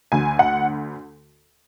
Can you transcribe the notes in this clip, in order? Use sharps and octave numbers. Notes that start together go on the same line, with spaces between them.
D2 D3 G#5
F#5